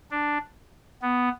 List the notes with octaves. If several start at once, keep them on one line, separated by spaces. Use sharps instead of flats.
D4
B3